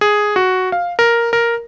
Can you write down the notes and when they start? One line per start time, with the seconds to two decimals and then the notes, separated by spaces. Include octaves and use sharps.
0.01 G#4
0.36 F#4
0.72 F5
0.99 A#4
1.33 A#4